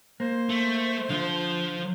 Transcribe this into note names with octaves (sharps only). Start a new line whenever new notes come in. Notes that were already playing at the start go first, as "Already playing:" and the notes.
A#3 C5
A3
D3 F3